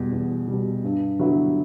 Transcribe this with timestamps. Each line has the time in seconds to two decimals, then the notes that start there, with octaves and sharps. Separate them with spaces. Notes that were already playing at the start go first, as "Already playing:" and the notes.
Already playing: E2 B2 G3
0.12 E2
0.48 G3
0.53 B2
0.84 G2
1.19 D3 F#3 B3 E4